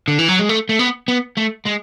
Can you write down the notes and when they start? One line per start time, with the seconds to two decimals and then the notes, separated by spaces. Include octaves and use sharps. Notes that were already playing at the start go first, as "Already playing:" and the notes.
0.08 D3
0.19 E3
0.28 F#3
0.39 G#3
0.49 A3
0.69 A3
0.79 B3
1.08 B3
1.37 A3
1.66 G#3